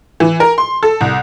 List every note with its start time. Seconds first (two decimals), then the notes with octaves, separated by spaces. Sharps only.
0.20 E3
0.40 A#4
0.58 C6
0.83 A4
1.01 C2